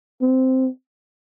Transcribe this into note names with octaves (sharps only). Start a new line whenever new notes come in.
C4